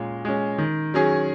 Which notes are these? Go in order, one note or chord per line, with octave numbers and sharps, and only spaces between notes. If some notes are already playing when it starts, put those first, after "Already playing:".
Already playing: A#2 G#3 C#4
G#3 C#4
D#3
F#3 C#4 G#4